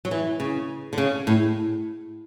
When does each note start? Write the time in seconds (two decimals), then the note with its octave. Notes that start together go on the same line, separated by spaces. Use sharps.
0.05 F#3
0.11 E3
0.40 C#3
0.93 D3
0.98 C#3
1.27 A2